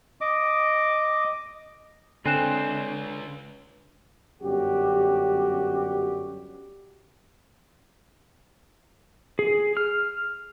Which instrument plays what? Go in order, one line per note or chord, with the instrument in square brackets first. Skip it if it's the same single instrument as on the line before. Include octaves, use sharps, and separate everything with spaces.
[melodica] D#5 D6
[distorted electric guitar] C#2 [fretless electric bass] D3 [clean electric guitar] C4 [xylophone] G#5 F#6 E7
[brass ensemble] G1 F#2 F#4 G4
[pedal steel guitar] G#4
F6